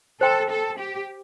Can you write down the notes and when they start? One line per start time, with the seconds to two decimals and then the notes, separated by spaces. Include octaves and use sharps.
0.21 A4 C5 G5 C6
0.50 A4
0.79 G4